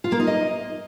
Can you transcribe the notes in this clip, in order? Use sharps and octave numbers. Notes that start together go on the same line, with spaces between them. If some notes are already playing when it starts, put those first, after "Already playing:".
F4
A#3
D#4
D#5